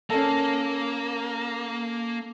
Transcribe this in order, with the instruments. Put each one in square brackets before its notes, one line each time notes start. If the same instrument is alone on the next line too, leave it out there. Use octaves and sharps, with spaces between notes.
[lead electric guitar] A#3 [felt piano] C#4 A4